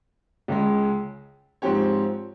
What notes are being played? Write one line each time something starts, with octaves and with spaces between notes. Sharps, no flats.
C#2 C#3 G#3
G#2 F3 C4 G4 C#5